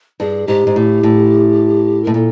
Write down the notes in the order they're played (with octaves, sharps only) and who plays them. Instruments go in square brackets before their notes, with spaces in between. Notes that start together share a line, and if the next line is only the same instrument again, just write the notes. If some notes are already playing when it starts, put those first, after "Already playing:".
[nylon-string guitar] G2 [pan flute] G#4
[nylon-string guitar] G#2 [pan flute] G4
[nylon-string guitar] G#2
A2
A2
[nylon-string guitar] A2 [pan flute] A#4
[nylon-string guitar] A#2 [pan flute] A4